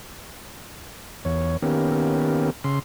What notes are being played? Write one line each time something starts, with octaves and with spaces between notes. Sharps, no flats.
E2 C#5
D#3 A#3 B3 C#4 G4
C#3 C6